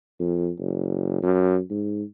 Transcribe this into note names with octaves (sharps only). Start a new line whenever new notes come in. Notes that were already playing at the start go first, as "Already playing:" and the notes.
F2
F#1
F#2
G#2